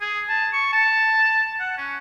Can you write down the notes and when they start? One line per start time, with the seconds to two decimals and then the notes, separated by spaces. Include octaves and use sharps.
0.01 G#4
0.29 A5
0.53 C#6
0.73 A5
1.60 F#5
1.77 C#4